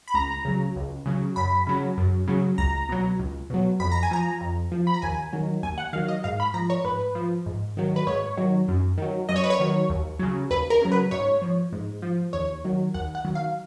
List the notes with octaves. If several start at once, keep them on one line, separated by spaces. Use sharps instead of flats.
B5
C#2 A#5
C#3 F#3
C#2
C#3 F#3
F#2 B5
C#3 F#3
F#2
C#3 F#3
C#2 A#5
B2 F#3
C#2
B2 F#3
F2 B5
A#5
G#5
F3 A#5
F2
F3
B5
A#5
D#2 G#5
D#3 F#3
D#2 G#5
F#5
D#3 F#3 F5
D#5
G#2 F5
B5
F3 A#5
C#5
G#2 B4
F3
G#2
D#3 F#3
B4
G#2 C#5
D#3 F#3
F#2
D#3 F#3
F#2 D#5
C#5
B4
C#5
D#3 F#3
D#2
C#3 F#3
D#2 B4
A#4
C#3 F#3
B4
G#2 C#5
F3
G#2
F3
D#2 C#5
D#3 F#3
D#2 F#5
F#5
D#3 F#3
F5